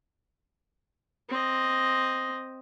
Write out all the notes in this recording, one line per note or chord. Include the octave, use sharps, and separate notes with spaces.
C4 D#5